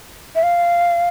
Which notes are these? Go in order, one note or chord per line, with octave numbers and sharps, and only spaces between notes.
E5
F5